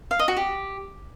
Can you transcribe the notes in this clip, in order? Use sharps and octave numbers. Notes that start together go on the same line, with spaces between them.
F5
D#5
F#4
G4